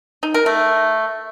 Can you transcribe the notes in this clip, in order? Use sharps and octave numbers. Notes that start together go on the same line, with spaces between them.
D#4
A#4
A3